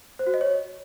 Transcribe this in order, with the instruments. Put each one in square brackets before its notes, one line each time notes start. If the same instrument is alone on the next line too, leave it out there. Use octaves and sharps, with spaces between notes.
[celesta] C5
F#4
D#5
C#5